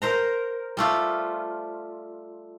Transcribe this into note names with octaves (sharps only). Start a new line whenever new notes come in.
A#4 C5 A#5
G3 A3 F4